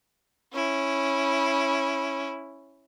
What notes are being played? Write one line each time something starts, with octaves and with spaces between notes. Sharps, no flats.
C#4 E4